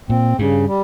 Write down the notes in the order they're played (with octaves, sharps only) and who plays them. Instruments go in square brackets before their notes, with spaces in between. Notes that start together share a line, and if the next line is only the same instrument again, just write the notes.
[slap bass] A#2 [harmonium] C4
[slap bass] G2 [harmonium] C#3
[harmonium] G3